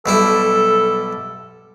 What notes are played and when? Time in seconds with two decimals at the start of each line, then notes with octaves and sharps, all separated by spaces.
0.06 B1 G3 E4 A4